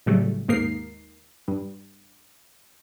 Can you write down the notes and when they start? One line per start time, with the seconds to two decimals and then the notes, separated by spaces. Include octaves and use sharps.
0.06 A2 C#3 F#3 G3 A3
0.48 D#2 G#2 A#3 D#4 A#4 C7
1.48 G2